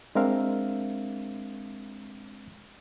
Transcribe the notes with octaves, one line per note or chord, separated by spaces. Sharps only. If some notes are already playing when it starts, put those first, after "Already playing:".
G#3 C4 D4 A#4 E5 F5